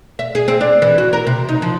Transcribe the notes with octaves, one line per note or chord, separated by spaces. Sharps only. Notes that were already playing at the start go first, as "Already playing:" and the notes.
E5
G#4
C4
D4
E3
F#4
A#4
C3
D#4
F3